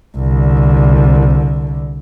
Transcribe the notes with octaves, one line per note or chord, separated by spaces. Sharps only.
C2 D3